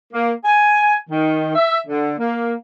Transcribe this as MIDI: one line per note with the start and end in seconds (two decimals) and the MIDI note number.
0.12 0.32 58
0.45 0.95 80
1.10 1.54 51
1.55 1.77 76
1.87 2.11 50
2.18 2.53 58